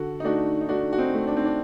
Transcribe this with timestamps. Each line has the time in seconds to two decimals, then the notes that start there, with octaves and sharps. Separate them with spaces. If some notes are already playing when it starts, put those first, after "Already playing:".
Already playing: D3 F#4 A4
0.20 D#4
0.25 A3 D4 F#4
0.61 D#4
0.69 A3 D4 F#4
0.93 F#4
0.98 C4 D#4
1.14 A3
1.27 D4
1.36 C4
1.45 D4